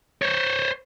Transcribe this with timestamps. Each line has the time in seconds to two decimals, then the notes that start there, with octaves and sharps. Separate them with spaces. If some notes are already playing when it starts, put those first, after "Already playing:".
0.22 C5 C#5